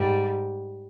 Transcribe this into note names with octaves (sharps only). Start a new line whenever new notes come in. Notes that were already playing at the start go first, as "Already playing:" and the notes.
Already playing: G#2 G3